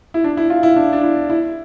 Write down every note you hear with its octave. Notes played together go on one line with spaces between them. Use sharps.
E4
D4
E4
F4
E4
D4
D4
E4
E4